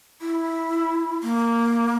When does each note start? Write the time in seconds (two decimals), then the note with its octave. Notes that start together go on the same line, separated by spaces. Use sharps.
0.22 E4
1.23 A#3